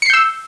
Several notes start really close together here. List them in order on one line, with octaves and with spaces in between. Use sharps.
C#7 C7 G6 E6